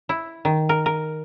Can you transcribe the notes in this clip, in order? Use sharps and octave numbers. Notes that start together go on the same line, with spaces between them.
E4
D#3
A#4
A#4